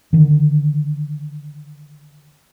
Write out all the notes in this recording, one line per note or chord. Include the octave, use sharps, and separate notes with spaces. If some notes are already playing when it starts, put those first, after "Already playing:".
D3 D#3